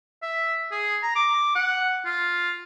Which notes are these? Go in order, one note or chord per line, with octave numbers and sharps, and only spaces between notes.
E5
G#4
A#5
D6
F#5
F4